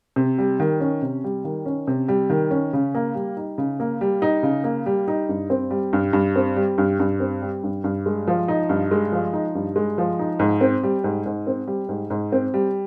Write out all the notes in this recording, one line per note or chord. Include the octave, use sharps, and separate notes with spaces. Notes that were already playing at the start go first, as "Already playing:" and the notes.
C3
G3
D#3
C#4
C3
G3
D#3
C#4
C3
G3
D#3
C#4
C#3
A#3
G3
D#4
C#3
A#3
G3
D#4
C#3
A#3
G3
D#4
G2
C4
G3
G2
G2
C4
G3
G2
G2
C4
G3
G2
G2
G#3
F3
D#4
G2
G#3
F3
D#4
G2
G#3
F3
D#4
G#2
C4
G3
G#2
G#2
C4
G3
G#2
G#2
C4
G3